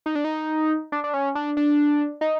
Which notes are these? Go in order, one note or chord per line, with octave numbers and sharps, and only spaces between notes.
D#4
D4
D#4
D4
D4
C#4
D4
D4
D#4